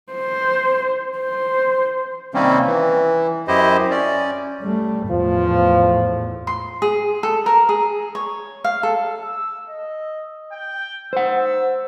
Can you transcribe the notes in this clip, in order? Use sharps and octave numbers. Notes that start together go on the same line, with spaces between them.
C5
C5
C3 D#3 G3 A#3 C4 C#4
E3
F#2 E4 G4 C5 D#5
C#4 D5
G3 A3
E2 A2 F3
C6
G#4
A4
A#4
G#4
C#5
F5
A4
E6
D#5
G5
C5 F#5 E6